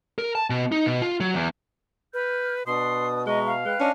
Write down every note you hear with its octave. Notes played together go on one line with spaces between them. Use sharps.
A#4
A5
B2
D#4
B2
F4
F#3
E2
B4 F6 G6
B2 D4 B4 C6 D#6
G#3 D#5 E5 A#5 C#6
F5
G#3 B4 G5 F#6
C#4 D4 D#5